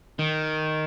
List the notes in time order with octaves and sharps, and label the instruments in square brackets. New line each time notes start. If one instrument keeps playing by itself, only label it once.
[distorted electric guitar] D#3